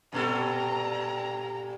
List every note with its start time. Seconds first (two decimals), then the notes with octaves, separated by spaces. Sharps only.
0.13 G2 A#2 A4 A#5